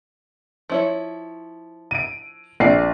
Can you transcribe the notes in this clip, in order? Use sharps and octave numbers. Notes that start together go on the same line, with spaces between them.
F3 E4 C#5
D7 D#7
A#1 C4 D5 C7